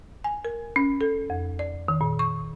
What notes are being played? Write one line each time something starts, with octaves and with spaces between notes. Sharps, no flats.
G#5
A#4
C#4
A4
F2
D5
D#3
A#2
C#6